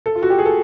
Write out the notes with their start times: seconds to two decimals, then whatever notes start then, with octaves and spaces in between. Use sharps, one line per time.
0.06 A4
0.15 F4
0.23 F#4
0.30 G4
0.39 G#4
0.45 A4